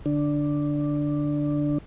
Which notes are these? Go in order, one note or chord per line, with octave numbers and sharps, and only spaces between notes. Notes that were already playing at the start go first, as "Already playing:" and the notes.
D3 D4